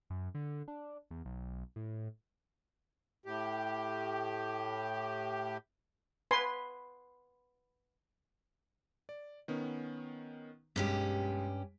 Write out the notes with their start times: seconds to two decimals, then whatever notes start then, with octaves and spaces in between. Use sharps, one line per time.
0.10 F#2
0.35 D3
0.68 D4
1.11 E2
1.25 B1
1.76 A2
3.26 A2 G4
6.31 B4 G#5 C6
9.09 D5
9.48 D#3 B3 C#4
10.76 B1 G2 G#3 C#4 G4 B6